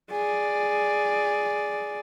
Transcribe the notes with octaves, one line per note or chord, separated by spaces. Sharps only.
G#4 D5